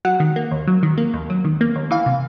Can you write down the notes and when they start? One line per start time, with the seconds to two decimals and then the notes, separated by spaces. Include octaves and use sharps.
0.05 F#3 F#5
0.20 D#3
0.36 A#3
0.51 D#2
0.67 F#3
0.83 D#3
0.98 A#3
1.14 D#2
1.30 F#3
1.45 D#3
1.61 A#3
1.76 D#2
1.91 E3 F5
2.06 C3